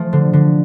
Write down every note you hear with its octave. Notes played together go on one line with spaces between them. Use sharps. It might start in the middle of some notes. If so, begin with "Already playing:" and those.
Already playing: F3 A3
D3
D3